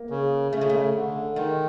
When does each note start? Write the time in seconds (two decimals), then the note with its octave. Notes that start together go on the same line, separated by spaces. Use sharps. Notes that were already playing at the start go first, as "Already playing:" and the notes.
Already playing: A#3
0.10 C#3
0.52 C#3 A3
0.61 G#3
0.70 A3
0.95 D3
1.36 D#3 G#3